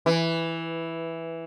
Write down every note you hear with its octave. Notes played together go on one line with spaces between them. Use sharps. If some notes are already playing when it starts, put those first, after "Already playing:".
E3